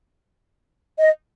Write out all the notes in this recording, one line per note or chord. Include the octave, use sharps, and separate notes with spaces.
D#5